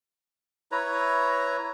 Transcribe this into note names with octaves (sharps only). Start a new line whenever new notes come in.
E4 B4 C#5 A#5